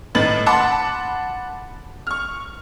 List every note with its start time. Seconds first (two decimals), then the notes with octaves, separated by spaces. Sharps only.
0.15 A2 D#3 B4 A6 F#7
0.46 F#5 A5 B5 C6 D6
2.07 C#6 F6